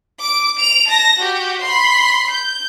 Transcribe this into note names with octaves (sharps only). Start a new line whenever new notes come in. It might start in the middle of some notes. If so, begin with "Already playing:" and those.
D6 D7
D7 F7
A5 A#6
F#4 G4
B5 C6
G6